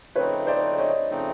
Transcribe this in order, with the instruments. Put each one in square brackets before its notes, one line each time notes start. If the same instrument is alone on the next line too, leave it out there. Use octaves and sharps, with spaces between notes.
[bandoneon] C#3 F3 A3 C4 D#4 [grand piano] B4 C#5
[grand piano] C5 D5
C#5 D#5
[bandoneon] C#3 F3 A3 C4 D#4